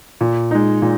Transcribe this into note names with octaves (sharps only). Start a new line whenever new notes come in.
A#2
G#3 D#4
A#2